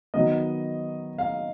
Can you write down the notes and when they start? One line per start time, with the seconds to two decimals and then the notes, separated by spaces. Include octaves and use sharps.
0.14 D#3 F#3 B3 D#5
1.18 F5